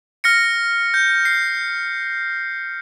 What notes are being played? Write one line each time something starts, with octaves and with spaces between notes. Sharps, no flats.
F6 A#6 C#7
G6
C7